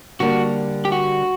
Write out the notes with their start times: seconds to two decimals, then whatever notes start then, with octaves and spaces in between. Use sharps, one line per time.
0.20 D3 G3 A#3 D4 F#4
0.85 G4
0.92 F#4